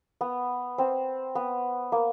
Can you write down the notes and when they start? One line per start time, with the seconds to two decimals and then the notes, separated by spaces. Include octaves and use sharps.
0.21 B3
0.78 C4
1.35 B3
1.92 A#3